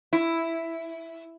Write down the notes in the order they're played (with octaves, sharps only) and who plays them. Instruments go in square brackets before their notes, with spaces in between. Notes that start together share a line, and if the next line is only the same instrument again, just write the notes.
[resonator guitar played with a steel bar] E4